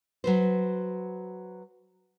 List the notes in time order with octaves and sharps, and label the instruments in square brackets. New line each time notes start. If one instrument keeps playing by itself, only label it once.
[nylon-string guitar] F#3 B4 C5